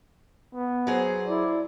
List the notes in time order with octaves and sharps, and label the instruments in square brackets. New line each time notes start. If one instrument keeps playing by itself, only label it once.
[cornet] B3
[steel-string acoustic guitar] F#3 G#4 C5
[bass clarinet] E4 [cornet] D5